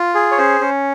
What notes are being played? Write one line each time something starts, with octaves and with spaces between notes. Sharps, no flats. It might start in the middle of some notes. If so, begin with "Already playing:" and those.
Already playing: F4
G#4
C#5
C#4 C5
C#4